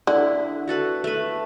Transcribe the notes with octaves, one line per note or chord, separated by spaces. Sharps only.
D3 E4
F#4 A4 B4
A3 B4